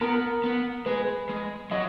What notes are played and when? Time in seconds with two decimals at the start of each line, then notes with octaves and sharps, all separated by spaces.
0.01 B3 A#4
0.44 B3
0.86 G#3 B4
1.29 G#3
1.71 F#3 D#5